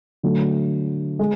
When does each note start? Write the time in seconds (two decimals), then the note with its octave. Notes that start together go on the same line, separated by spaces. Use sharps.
0.23 D3 F#3 A3
1.19 G#3